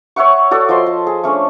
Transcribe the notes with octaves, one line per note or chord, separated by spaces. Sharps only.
C#5 E5 F#5 C#6
F#4 A4 D5
F3 D#5 C6
A5
G#4
A3 C#4 D4